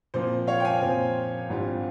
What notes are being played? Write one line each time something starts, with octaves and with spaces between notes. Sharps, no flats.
A#2 F3 C4 C5
C#5 F5
G5
F5 G#5
A#2 F3 C4
G#1 G2 G3 C4 F4